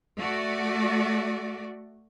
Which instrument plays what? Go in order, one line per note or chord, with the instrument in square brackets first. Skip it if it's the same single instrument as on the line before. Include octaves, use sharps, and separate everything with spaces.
[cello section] A3 F#4 D5